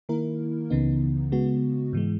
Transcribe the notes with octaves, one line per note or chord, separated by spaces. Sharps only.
D#3 A#3 E4 A#4
C#2 C#3 E3 B3 D#4
C#3 G#3 B3 F#4
G#2 E3 G#3